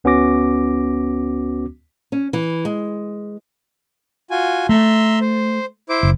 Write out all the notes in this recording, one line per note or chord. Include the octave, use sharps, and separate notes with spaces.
D2 B3 C#4 F#4 D6 A#6
C#4
E3
G#3
F4 F#4 G#5
A3 E5 A#5 C6
C5
E4 C5 D6
F#1